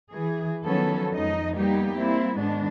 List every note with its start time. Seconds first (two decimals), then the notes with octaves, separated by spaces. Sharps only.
0.11 E3 G#4
0.66 D#3 F3 F#3 B3 C#4 A4
1.13 F2 G#3 D#4 D#5
1.55 G3 A#3 B3 D#4 G4
1.98 G3 A#3 C4 E4
2.38 G#2 D#3 G#3 B3 D4